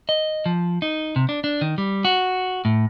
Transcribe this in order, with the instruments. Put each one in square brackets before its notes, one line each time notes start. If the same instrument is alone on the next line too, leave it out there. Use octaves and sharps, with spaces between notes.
[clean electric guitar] D#5
F3
D#4
C3
D4
D4
D#3
G3
F#4
A2